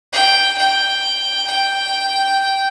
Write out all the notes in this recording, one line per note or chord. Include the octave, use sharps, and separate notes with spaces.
G5
G5
G5